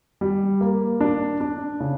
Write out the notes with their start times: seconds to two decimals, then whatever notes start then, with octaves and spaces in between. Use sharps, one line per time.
0.21 G3
0.61 A#3
1.01 D4
1.41 D4
1.80 C#3